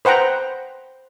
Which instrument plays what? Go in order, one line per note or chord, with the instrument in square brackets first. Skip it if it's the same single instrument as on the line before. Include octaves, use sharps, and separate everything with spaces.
[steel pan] B4 C5 F#5 G5 A#5